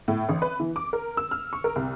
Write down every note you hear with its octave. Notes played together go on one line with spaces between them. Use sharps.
A2
A1
B4
E3
D6
A#4
E6
F6
C#6
A#4
C2